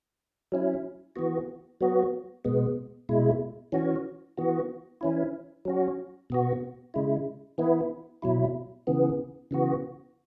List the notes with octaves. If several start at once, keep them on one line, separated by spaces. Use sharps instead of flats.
F#3 C#4 E4
E3 B3 F#4
F#3 B3 F#4
B2 G#3 B3
B2 G#3 E4
E3 C#4 F#4
E3 B3 F#4
E3 C#4 E4
F#3 C#4 F#4
B2 B3 F#4
C#3 G#3 E4
E3 B3 E4
B2 F#3 E4
C#3 E3 B3
C#3 E3 B3 F#4